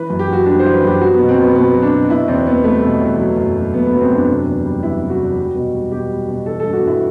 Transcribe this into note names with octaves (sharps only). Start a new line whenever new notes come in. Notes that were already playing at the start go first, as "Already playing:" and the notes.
Already playing: E3 B4
F#2
G4
F#2 F#4
G3 D4
C5
E3
B4
F#2 G4
F#3 F#4
B3
B2
C4
F#3 B3
B2 B3
F#3
D4
B2
B2 E4
E2 C4
E2 B3
G3 A3
B2
E2
F#3
F#2
F#3
F#2 B3
B3
F#3
C4
F#2 D4
C3
E2
G3
E3 E4
C3
F#4
E2
G3
B2
G3
B2 G4
G3
B2
E3 A4
G2 A4
F#4
G2 E4